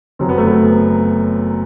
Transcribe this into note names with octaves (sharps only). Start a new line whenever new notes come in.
F#1 F#2 F#3 C4
B3
A3
B3